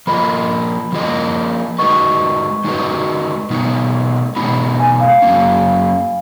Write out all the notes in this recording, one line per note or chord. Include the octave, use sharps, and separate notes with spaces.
F3 A#3 F4 A#4 D#5 B5
F3 A#3 F4 A#4 D#5
G#3 D#4 F#4 B4 D#5 C#6
G#3 D#4 F#4 B4 D#5
B2 G#3 B3 D#4
B2 G#3 B3 D#4 B5
G#5
F5
F#2 D#3 F#3 A#3 C#4